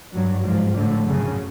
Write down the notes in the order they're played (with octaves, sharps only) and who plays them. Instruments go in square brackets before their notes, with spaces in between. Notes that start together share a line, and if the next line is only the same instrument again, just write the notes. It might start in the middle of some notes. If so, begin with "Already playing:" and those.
[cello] G2 [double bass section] F#3
[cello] G#2 [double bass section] F3
[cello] A2 [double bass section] D3
[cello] F#2 [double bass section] C#3